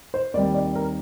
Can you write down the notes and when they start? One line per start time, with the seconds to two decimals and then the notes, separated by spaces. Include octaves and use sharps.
0.14 C5
0.34 D#2 D#3 G3 C4 D5
0.54 D5
0.75 A#4